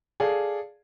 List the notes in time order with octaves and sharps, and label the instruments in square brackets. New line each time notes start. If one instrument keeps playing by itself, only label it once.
[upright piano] G#4 A4 D5 F5